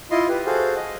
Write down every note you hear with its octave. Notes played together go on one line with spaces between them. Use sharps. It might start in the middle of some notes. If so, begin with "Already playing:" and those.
E4 F4 D#5 C6
G4 B4
F#4 G#4 A4 C5 F5
D#5